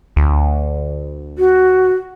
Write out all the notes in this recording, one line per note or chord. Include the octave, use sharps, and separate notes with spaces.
D2
F#4